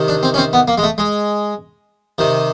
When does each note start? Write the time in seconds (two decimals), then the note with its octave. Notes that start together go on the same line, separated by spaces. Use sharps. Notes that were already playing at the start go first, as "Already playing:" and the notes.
Already playing: C3 D#3
0.08 D4
0.23 C4
0.34 C#4
0.38 C4
0.53 B3
0.68 A#3
0.78 G#3
0.83 A3
0.98 G#3
2.18 C3 D#3